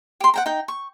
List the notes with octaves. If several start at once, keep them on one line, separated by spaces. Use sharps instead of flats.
G4 C6
F#5 G5 A#5
D#4 G5
C#6